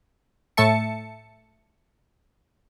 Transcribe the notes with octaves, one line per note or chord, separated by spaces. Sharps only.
A2 A3 E5 A5 C#7